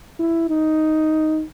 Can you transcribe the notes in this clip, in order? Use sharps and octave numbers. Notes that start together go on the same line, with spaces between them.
E4
D#4